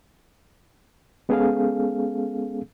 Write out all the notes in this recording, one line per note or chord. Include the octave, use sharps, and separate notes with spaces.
G#3 B3 C#4 G#4 A4 F5